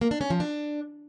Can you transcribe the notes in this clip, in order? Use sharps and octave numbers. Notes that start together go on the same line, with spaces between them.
A#3
D4
C#4
F3
D4